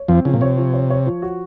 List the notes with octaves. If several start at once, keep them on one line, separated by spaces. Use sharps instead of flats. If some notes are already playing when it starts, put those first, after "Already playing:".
Already playing: C#5
F2 F3 C4
C#3 F3
A#2
C3 C#5
F3
C#5
C#5
F3
F#4